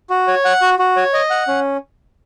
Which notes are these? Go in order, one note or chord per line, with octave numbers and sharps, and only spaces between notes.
F#4
C#5
F#5
F#4
F#4
C#5
D#5
F#5
C#4